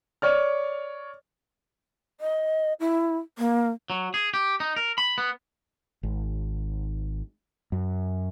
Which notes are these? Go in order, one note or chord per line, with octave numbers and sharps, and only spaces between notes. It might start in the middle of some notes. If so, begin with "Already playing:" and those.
C#5 D5 F6
D#5
E4
A#3
F#3
G#4
G4
D#4
A#4
B5
B3
G#1
F#2